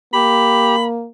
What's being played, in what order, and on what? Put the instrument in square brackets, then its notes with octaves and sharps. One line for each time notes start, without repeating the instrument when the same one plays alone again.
[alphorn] A#3 [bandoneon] G4 [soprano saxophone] B5